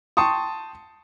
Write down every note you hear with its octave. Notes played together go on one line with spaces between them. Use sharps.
G5 A5 C6 C#6 D#6